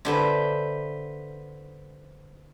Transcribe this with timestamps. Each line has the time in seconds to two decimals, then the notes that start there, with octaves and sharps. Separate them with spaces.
0.05 D3 G4 B4 C5 E5 G#5